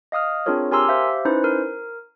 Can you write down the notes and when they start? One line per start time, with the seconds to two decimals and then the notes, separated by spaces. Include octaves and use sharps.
0.12 D#5 F5 D#6 F6
0.46 C4 D4 F4 G#4 A#4 C#5
0.71 G4 A#4 G#5 A#5 C6 E6
0.88 G4 C5 E5 F5
1.25 C#4 D#4 E4 B4 C5
1.44 A#4